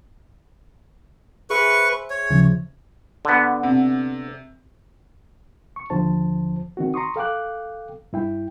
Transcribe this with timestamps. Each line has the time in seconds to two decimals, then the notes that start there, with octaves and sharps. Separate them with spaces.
1.50 G#4 B4 C5 E5 C#6
2.10 C#5
2.30 D#2 C#3 F3
3.25 D3 B3
3.63 C3
5.76 C#6
5.90 D#2 D3 F3 C5 A5
6.77 D#3 C4 F#4
6.94 A#5 C6 C#6 D#6
7.16 A4 F5 G5 D6 F#6
8.13 G2 E4 G5